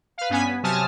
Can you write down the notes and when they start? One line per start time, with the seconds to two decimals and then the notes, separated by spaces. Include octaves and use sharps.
0.18 B4 F5
0.30 G2 B3 C#4 G#5 B6
0.46 B3
0.63 C3 F#3 G#5 A5 D#6 F6